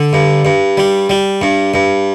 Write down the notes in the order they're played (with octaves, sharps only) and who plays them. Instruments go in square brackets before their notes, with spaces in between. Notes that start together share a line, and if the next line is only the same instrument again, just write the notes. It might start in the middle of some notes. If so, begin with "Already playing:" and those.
Already playing: [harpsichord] D3
G2
G2
G3
G3
G2
G2